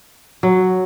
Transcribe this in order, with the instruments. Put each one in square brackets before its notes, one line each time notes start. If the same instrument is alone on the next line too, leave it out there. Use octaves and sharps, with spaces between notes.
[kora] F#3